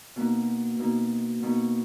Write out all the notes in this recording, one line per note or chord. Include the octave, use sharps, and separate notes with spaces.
B2 A#3 D#4 F#5
B2 A#3 D#4
B2 A#3 D#4 C#6